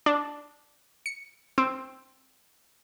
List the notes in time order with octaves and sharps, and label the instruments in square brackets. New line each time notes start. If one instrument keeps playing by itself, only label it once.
[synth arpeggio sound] D4
C#7
C4